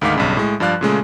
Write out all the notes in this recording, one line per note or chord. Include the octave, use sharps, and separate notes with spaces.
D2 G#2 D#3 F5 D6 B6
B1 G2 C#3
A2 G#3
G2 F3 D5 F5 F#6
A#2 C#3 G#3 A3